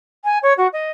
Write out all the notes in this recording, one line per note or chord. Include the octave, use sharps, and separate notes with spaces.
G#5
C#5
F#4
D#5